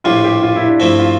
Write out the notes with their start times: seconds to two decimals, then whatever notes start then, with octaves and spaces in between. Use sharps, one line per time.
0.04 A#1 A2 G3 F4
0.24 G4
0.43 F4
0.56 E4
0.67 D4
0.80 G2 F3 A3 C4 E4
0.99 F4